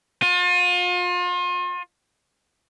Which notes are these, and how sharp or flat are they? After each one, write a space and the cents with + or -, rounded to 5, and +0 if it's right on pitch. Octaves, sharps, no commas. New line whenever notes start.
F4 +35